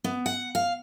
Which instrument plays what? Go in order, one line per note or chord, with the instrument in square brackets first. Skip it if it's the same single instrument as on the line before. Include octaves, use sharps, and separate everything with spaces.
[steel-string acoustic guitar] B3
F#5
F5